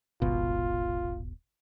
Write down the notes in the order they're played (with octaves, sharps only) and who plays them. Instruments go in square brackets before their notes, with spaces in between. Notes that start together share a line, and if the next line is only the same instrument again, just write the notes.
[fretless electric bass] D#1 G#1 B2 [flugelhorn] F4